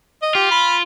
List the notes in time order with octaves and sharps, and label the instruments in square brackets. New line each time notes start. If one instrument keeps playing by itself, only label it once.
[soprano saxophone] D#5
[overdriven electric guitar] F4 [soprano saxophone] G4
[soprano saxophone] B5